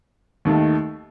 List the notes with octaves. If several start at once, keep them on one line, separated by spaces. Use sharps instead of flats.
D#2 D#3 A3